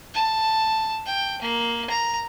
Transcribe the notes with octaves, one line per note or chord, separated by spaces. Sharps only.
A5
G5
A#3
A#5